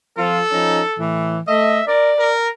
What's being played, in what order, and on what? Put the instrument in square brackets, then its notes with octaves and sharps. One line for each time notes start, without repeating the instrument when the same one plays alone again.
[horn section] F3 C4 F4 [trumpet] A4
[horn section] F3 C#4 D#4
A2 E3
[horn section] A3 D#5 [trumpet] E5
[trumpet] A#4 [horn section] D5
[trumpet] A#4